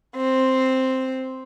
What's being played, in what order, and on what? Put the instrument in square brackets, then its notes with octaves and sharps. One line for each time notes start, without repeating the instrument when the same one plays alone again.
[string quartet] C4